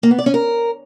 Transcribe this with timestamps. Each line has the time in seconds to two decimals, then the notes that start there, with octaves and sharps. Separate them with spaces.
0.03 A#3
0.11 B3
0.19 D5
0.26 C#4
0.34 A#4